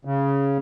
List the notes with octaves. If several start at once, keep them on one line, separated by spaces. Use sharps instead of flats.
C#3